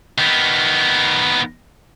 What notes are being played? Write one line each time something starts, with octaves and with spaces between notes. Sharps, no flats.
D#3 B3